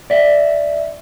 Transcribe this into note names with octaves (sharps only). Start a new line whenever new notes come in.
D5 E5